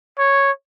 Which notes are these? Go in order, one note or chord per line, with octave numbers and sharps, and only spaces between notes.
C#5